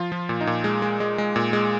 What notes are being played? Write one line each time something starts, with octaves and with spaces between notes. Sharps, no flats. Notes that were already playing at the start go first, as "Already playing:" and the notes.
Already playing: F3 F4
F3
A#2
D#4
A#2
G#3
G#3
G#3
G#3
A#2
G#3